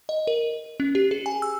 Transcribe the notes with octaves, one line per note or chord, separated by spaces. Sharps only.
D#5
A#4
C#4
G4
G#4
G#5
E6